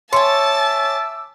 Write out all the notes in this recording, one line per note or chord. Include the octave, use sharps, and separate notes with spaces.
C#5 E5 G#5 A5 C6 D6 E6 A6